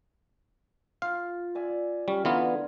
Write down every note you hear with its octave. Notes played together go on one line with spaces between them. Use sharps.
F4 F5
D5 E5 G#5
G3 C#4
D3 E3 B3 F4 G#5 A#5